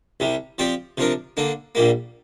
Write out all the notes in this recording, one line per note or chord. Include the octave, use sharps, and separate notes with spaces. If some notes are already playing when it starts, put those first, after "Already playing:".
C2 C3 G3
F3 C4 G4 D5
C3 F3 D4 A#4
D3 A#3 D4
A#1 A#2 G3 A#3